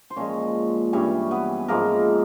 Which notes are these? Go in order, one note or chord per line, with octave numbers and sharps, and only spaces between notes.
C5
A#2 F3 G#3 C#4 C#5
G2 E3 G3 C#4 C#5
B3 B4
G#2 F3 G#3 A#3 A#4